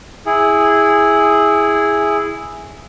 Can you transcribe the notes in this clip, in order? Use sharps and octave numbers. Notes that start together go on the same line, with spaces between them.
E4 G#4